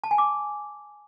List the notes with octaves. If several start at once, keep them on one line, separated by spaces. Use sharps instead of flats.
A5
G#5
D6